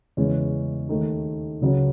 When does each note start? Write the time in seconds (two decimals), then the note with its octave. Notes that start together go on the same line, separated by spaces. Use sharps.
0.17 E2 C#3 G#3 C#4
0.89 D#2 D#3 A3 D#4
1.61 C#2 C#3 F#3 C#4